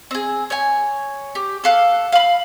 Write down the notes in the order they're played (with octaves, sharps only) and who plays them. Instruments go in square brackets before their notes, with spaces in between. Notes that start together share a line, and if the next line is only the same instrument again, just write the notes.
[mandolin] C4 G#4
C#5 G#5
G4
A4 F5 F#6
F5 B5